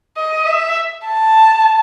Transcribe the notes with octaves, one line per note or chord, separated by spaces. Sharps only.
D#5
E5
A5